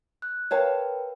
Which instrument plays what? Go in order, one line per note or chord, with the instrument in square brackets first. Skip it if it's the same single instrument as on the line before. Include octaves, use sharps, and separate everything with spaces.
[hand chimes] F#6
[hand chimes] A#4 B4 G5 [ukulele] C#5 F5 A5